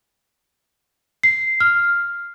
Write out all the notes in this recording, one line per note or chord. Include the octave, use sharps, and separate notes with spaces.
C7
F6